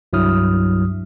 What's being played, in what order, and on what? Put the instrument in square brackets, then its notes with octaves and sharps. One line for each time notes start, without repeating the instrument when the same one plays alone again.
[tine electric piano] C2 G2 F#3 E4 D#6 F6